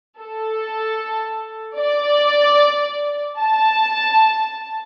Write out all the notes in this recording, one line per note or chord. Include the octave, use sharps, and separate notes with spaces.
A4
D5
A5